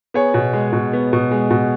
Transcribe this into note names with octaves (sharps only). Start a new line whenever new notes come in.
B3 G#4 C#5
B2
G#3
B2
B3
B2
G#3
B2